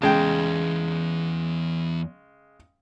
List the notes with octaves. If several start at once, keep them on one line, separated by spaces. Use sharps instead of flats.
E2 C#3 G#3 G5 A5